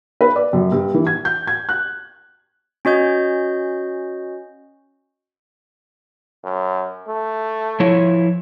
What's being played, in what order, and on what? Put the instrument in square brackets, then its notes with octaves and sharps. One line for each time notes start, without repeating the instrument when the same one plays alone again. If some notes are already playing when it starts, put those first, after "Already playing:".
[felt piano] B4
D5
F#2
G2
E3
G#6
G6
G#6
F#6
[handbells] C#4 F#4 D#5 G6
[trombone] F#2
A3
[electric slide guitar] F3 E4 C#5